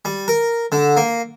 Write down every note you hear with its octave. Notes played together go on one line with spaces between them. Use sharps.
G3
A#4
D3
A#3